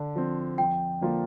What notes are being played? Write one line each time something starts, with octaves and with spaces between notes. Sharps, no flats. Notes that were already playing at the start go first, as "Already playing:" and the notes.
Already playing: D3 A5
F3 C4
F2 G5
D3 F3 A#3 F4